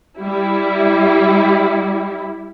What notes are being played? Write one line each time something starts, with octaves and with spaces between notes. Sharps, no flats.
G3 E4